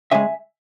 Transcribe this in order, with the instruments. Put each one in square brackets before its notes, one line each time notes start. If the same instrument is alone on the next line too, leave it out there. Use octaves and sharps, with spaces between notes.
[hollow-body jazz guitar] C#3 G#3 E5 G#5